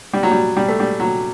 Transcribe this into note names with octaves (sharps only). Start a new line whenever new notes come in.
G3
F#3
G3
G3
A3
G3
F#3